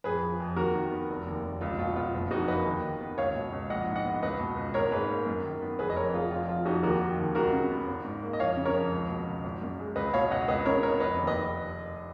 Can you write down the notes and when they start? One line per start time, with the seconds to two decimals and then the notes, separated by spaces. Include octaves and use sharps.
0.04 F2 G#4 B4
0.23 F3
0.40 F2
0.56 D#2 F#4 A#4
0.75 D#3
0.91 B3
1.10 F1
1.27 D#2
1.44 F1
1.61 C#2 F4
1.78 B2 F4
1.96 B3 F4
2.14 F#1
2.31 F2 D#4 F#4
2.48 A#3 B4 D#5
2.66 D#2
2.83 D#3
3.01 B3
3.18 C#2 C#5 F5
3.35 B2
3.53 C#2
3.70 A#1 D#5 F#5
3.87 G#2
3.96 D#5 F#5
4.05 B3
4.22 C#2 B4 D#5
4.40 B2
4.56 C#2
4.74 G#1 A#4 C#5
4.92 G#2 G#4 B4
5.09 A#3
5.26 F#2
5.44 D#3
5.62 B3
5.79 F1 G#4 B4
5.90 D#5
5.96 F2 A#4 C#5
6.13 F1 F4 G#4
6.31 F2 F4
6.48 F3 F4
6.65 F2 D#4 F#4
6.83 D#2 F#4 A#4
7.01 D#3
7.17 D#2
7.35 C#2 F#4 A#4
7.53 C#3
7.70 B3
7.88 G#1
8.05 G#2
8.23 A#3
8.33 D#5
8.39 F2 C#5 F5
8.57 C#3
8.65 A#4 C#5
8.74 F2
8.92 C#2
9.09 B2
9.27 C#2
9.44 G#1
9.61 F#2
9.79 G#3
9.96 C#2 B4 D#5
10.13 B2 C#5 F5
10.31 C#2 D#5 F#5
10.48 C#2 B4 D#5
10.65 C#3 A#4 C#5
10.83 B3 A#4 C#5
11.00 F1 B4 D#5
11.19 D#2
11.27 B4 D#5